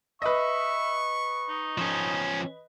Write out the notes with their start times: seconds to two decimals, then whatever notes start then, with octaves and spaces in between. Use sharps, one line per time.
0.22 B4 D#5 E5 C#6
1.49 D#4
1.78 F3 C#4